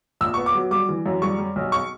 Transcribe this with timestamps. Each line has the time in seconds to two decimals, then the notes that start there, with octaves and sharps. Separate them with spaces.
0.21 A#1 E6
0.34 B3 C#6
0.46 D6
0.55 F#3
0.71 G3 D6
0.89 E3
1.06 F#2
1.22 G3 C#6
1.38 G3
1.56 B1
1.72 C#6